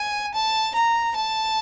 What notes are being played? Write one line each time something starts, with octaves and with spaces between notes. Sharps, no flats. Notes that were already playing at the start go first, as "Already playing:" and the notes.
Already playing: G#5
A5
A#5
A5